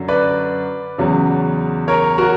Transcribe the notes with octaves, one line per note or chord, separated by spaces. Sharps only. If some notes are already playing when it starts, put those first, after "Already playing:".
Already playing: F#2 D3 F#3
B4 D5
E2 C#3 F#3
A#4 C#5
F#4 A#4